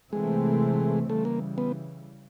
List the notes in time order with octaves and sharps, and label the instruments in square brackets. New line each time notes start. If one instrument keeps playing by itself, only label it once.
[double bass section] C3 E3 A3 C4 [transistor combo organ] G#3
[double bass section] C#3 E3 G3 [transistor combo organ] A3
[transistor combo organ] A#3
B3